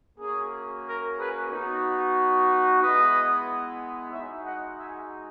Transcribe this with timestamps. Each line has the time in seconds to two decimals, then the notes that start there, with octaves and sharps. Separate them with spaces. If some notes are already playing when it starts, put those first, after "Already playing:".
0.19 A#3 C#4 F#4 G#4
0.85 A#4
1.17 G#4 B4
1.49 B3 D#4 F#4
2.80 G#3 B3 E4 B4 D#5
4.10 G#3 D#4 F#4 C#5 E5
4.43 D#5 F#5
4.76 E5 G#5